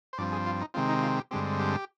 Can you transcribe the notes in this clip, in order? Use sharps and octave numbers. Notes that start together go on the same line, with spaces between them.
C5
G2 F3 C4 D5
G#4
F4
D#4
C3 D#3 G#3 C4 F4
D#4
F4
G4
G2 D3 G#3 C4 G4
G4